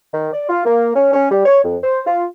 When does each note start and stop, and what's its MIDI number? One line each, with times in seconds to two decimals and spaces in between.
0.13 0.28 51
0.33 0.46 74
0.48 0.64 65
0.65 0.91 58
0.95 1.12 61
1.13 1.30 61
1.30 1.43 55
1.46 1.60 73
1.64 1.76 41
1.83 2.01 72
2.06 2.25 65